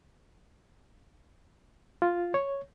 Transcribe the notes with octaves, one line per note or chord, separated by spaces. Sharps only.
F4
C#5